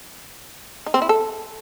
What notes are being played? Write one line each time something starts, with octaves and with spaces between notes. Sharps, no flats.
D#4
C4
E4
A4